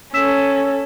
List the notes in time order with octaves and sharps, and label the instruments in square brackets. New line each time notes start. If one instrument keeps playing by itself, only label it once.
[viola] C#4 A4 [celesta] E6 B6 E7